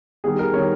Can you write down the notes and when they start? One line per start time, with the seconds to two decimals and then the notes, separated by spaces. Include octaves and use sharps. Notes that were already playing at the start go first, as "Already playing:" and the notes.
0.24 D#3 G3 B3 G#4
0.39 A#4
0.54 D#3 G3 B3 C#5